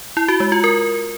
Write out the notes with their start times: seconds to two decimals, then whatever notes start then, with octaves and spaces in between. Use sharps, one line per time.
0.17 E4
0.28 F#4
0.40 G#3
0.52 F4
0.64 A#4